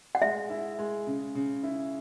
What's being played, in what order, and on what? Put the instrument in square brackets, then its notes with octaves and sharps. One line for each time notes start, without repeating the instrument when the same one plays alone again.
[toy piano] F#5
[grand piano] G#3 [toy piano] E5
[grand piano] E4
G#3
C#3
C#3
E4